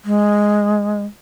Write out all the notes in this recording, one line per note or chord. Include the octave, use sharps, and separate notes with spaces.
G#3